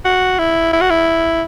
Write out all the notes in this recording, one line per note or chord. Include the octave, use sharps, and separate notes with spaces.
F#4
E4
E4
F#4
E4